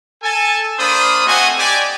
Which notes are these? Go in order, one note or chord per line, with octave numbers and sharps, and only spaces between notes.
A4 G#5 A5
A#3 D4 C5 B5 D#6
A3 C4 F#4 D#5 F#5 G#5
G4 D5 G#5